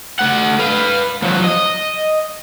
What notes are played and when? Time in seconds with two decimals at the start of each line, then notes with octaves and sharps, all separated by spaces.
0.19 A3 F#5
0.59 B4 F5
1.22 F3 F#3
1.44 D#5